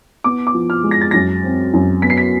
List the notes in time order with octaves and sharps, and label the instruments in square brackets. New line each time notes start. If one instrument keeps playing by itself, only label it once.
[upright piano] B3 D6
D6
F3
F6
G#3
A#6
A6
F#2 A#6
C4
F#2
B3 B6
C7
B6